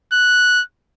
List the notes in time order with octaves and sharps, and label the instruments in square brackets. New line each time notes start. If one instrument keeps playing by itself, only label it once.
[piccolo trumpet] F#6